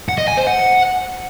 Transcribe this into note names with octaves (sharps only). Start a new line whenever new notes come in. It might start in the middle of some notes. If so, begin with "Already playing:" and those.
F#5
D#5
G#5
C5
F#5